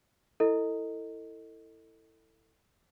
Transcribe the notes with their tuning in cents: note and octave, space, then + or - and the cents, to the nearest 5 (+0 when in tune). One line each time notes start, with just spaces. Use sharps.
E4 +0 A4 +25 D#5 +0